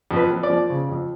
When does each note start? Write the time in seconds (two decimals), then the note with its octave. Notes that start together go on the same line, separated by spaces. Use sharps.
0.11 F2
0.16 B4
0.30 F2
0.43 D5
0.50 F3
0.70 C#3
0.89 F2